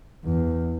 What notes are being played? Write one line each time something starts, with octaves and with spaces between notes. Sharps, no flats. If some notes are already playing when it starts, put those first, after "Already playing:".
E2